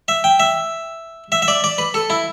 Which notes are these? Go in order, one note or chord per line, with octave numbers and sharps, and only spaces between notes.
E5
G5
E5
E5
E5
D5
D5
B4
A4
E4